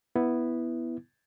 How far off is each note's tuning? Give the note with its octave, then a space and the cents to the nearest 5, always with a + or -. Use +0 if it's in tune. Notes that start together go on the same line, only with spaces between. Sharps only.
B3 +0 E4 +0